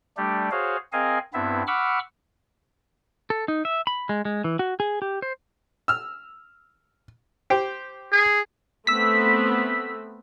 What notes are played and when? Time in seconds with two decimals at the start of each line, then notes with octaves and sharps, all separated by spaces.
0.17 G3 A3 D4 G4
0.51 F#4 G#4 C5 C#5 F5
0.93 C4 G#4 A#4 D#5 F5 G#5
1.34 G2 B3 C4 E4 E5
1.67 F#5 B5 C#6 D6 E6 F6
3.30 A4
3.48 D#4
3.65 E5
3.87 B5
4.09 G#3
4.25 G#3
4.44 E3
4.59 F#4
4.80 G#4
5.02 G4
5.22 C5
5.88 E6 F6
7.50 G4 C5 G5
8.12 G#4
8.87 A3 B3 C4 E6 B6